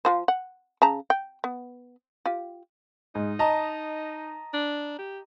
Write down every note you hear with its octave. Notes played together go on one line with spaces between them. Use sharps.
F3 F4 C5
F#5
C#3 A5 A#5
G5
B3
F4 G4
G#2 D#4
D#5 A5 A#5
D4
G4